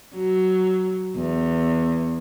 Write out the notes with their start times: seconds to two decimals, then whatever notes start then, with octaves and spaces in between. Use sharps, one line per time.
0.14 F#3
1.16 E2